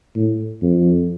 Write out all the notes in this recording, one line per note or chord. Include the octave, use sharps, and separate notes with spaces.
A2
F2